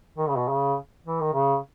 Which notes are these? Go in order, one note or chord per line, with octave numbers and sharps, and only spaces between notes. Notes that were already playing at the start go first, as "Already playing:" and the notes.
D#3
C#3
B2
C#3
E3
D#3
C#3